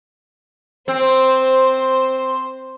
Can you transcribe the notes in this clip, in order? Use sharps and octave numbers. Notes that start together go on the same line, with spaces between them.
C4 C5